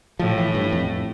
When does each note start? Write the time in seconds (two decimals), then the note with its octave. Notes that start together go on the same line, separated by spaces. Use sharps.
0.19 A2 F3
0.38 E3
0.55 G2
0.72 F2